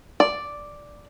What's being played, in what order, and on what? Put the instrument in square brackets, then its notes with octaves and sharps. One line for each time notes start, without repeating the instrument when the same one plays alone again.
[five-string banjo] D5